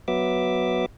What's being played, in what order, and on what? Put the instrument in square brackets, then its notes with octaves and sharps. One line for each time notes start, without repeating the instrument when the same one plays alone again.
[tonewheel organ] F#3 B3 E5 D6